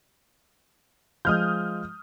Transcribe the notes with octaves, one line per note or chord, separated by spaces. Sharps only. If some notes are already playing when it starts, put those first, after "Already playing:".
F3 G#3 D#6 F6 G6